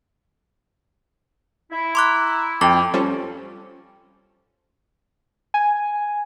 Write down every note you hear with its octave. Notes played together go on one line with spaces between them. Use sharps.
E4
A#5 C6 D6 F#6
F2 G5 D6
G3 C#4 F4 A4 C5 C#5
G#5